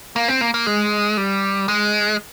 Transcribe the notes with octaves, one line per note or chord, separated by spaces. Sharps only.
A#3
C4
A#3
A#3
G#3
G3
G#3